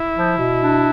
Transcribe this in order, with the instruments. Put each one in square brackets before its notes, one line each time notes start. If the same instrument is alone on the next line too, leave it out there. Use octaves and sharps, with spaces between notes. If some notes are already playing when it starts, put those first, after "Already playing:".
Already playing: [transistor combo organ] E4
[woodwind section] F3
B2
D4